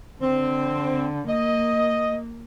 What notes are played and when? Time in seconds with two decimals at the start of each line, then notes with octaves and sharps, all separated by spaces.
0.22 D3 C4
1.29 A#3 D#5